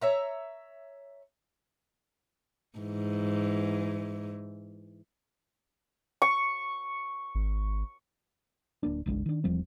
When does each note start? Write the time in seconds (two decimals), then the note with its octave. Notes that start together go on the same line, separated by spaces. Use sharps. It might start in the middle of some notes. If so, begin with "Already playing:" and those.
0.01 C#5 E5 A#5
2.79 G#2 E3
6.22 C#6
7.35 G#1
8.83 D1 A#3 D4
9.06 F#1 B1 G#3 D4
9.26 D#3 D4
9.44 E1 F3 G3 C4